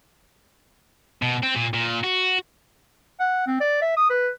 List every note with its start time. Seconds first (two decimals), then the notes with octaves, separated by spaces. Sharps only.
1.22 B2
1.43 C4
1.55 A#2
1.74 A#2
2.04 F#4
3.20 F#5
3.47 C4
3.61 D5
3.82 E5
3.97 D#6
4.10 B4